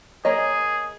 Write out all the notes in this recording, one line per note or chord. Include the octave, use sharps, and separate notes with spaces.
A#3 G#4 C#5 D#5